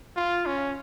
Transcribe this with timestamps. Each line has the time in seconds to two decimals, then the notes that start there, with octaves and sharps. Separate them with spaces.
0.16 F4
0.46 C#4